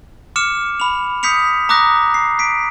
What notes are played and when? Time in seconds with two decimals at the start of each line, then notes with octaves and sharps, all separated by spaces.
0.36 D6 F6 C#7 E7
0.80 B5 F7
1.23 D#6 G6 B6 C#7 F7
1.69 A#5 D6 D#6 F#6 A#6
2.14 C7
2.39 B6 D7